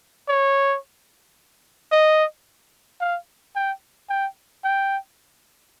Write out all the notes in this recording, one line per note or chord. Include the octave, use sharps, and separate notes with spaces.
C#5
D#5
F5
G5
G5
G5